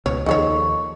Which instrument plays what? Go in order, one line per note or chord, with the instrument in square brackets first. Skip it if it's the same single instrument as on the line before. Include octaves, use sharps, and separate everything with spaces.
[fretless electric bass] C#2 B2 [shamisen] C#5
[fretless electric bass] D#2 F3 [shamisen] D#4 A4 C#5 [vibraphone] C#6